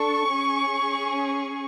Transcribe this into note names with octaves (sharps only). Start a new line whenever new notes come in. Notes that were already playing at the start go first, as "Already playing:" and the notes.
Already playing: D4 A4 C#6
C#4 G#4